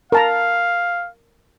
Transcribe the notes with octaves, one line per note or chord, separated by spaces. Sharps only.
A#4 F5 A5 A#5